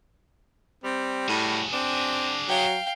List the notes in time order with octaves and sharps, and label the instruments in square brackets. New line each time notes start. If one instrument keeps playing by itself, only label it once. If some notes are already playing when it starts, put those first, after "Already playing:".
[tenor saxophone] G3 [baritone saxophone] C4
[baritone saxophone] A2 [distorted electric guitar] F#4 G#4
[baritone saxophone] C4 [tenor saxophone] D4
[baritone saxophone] F#3 [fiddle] F5 G5